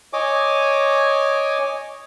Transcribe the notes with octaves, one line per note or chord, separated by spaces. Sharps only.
C#5 D#5 G#5 D6